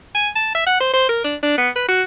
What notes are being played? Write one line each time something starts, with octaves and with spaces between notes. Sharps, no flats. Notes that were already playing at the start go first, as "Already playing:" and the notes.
G#5
A5
E5
F#5
C5
C5
A#4
D4
D4
B3
B4
F#4